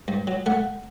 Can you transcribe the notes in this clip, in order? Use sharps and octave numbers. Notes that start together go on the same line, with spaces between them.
G2
F#3
A3 F#5